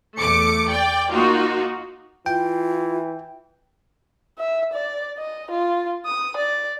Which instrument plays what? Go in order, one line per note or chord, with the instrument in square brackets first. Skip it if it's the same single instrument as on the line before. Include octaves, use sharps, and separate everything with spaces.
[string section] E2 A3 D6 C#7
D5 G5
A#3 D#4 F4 F#4
[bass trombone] E3 [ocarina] F4 [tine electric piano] G5
[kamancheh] E5
D5
D#5
F4
D#6
D5